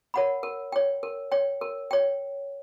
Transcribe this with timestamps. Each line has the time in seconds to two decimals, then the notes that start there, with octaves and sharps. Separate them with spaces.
0.14 A#4 C#5 F#5 B5
0.43 A#4
0.72 C#5 G5
1.03 A#4
1.32 C#5 G5
1.61 A#4
1.91 C#5 G5